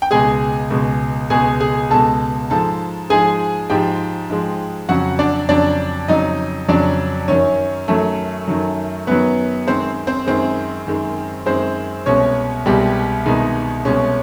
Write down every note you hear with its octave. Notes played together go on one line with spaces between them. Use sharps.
G5
C#2 B2 G#3 G#4 G#5
C#2 B2 G#3
C#2 B2 G#3 G#4 G#5
G#4 G#5
C#2 B2 G#3 A4 A5
G#2 F3 G#3 A4 A5
G#2 F3 G#3 G#4 G#5
G#2 F3 G#3 G4 G5
G#2 F3 G#3
F2 C#3 F#3 F#4 F#5
D4 D5
F2 C#3 F#3 D4 D5
F2 C#3 F#3 D#4 D#5
F2 C#3 F#3 D4 D5
F#2 D#3 F#3 C#4 C#5
F#2 D#3 F#3 A3 A4
F#2 D#3 F#3
F#2 D#3 F#3 B3 B4
F#2 D#3 G#3 C4 C5
C4 C5
F#2 D#3 G#3 C4 C5
F#2 D#3 G#3
F#2 D#3 G#3 C4 C5
C2 B2 G#3 C#4 C#5
C2 B2 G3 G#3 G4
C2 B2 D#3 G#3 D#4
C2 B2 G#3 C#4